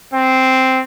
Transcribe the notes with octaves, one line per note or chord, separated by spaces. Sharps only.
C4